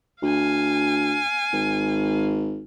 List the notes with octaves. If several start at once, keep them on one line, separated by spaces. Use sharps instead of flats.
D2 F5 G#5
G#1